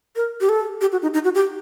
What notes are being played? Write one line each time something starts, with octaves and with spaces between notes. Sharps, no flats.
A#4
G4
A4
G4
F#4
D#4
D#4
F#4
G4